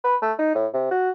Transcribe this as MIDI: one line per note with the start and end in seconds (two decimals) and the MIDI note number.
0.04 0.16 71
0.22 0.33 57
0.39 0.54 63
0.55 0.67 45
0.74 0.90 48
0.91 1.10 66